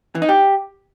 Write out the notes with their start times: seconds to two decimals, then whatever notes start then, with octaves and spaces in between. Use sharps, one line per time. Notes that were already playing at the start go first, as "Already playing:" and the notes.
0.15 E3
0.22 D#4
0.29 G4